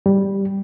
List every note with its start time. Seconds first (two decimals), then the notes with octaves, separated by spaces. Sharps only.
0.06 G3